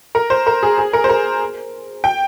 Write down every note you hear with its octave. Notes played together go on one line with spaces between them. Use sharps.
A#4
C5
A#4
G#4
G#4
A#4
C5
A#4
G5